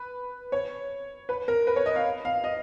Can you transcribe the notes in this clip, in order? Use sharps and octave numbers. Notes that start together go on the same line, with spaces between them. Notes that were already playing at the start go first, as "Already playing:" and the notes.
Already playing: B4
C#5
B4
A#4
B4
C#5
D#5
F5
F5
D#5